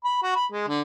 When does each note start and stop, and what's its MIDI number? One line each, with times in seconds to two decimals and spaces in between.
0.04 0.19 83
0.23 0.33 66
0.36 0.46 83
0.52 0.66 56
0.68 0.81 50